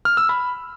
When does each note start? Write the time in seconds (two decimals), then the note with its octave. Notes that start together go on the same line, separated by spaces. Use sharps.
0.05 F6
0.17 E6
0.29 B5